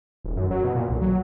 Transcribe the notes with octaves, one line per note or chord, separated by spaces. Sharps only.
D#1
F#2
F#3
B2
A#2
B1
F#3